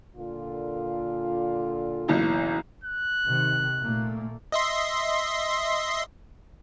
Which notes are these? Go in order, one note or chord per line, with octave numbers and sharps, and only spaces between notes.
A#2 D3 F4
F#1 B1 E3
F#6
C3 D#3
A#2 A3 A#3
D#5 E5 C6